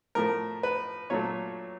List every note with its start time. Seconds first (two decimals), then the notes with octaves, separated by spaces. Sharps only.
0.15 A2 F3 A3 A#4
0.63 B4
1.10 A#2 F#3 A3 C#5